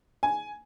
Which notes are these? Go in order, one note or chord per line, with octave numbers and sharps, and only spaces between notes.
G#5